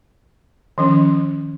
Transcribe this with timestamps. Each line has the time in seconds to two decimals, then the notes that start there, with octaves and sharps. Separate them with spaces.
0.78 D#3 F3 C#4